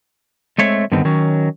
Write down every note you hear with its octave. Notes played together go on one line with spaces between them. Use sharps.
G#3 A3 C4 C#5 E5
G2 D3 D#3 B3 C4
D#3 F#3 C#4